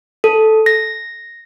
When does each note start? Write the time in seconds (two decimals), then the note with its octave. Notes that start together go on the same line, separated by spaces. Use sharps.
0.24 A4
0.66 A#6